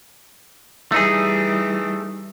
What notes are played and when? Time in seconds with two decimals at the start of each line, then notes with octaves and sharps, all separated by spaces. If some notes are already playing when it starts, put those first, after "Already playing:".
0.92 E3 G3 A3 D#4 G#4